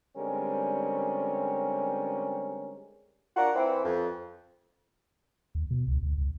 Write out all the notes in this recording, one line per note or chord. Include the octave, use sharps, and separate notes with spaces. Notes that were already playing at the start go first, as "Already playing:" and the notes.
D3 G3 G#3 C4 C#4 A#4
D4 F4 A#4 F#5
E3 C4
F2
D#2
B2
C#2
D2
C#2